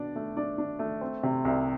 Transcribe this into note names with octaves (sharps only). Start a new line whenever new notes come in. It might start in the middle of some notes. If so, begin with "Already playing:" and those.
Already playing: B2 D4 D5
A3
D4 D5
D4
A3
C4
C3
C2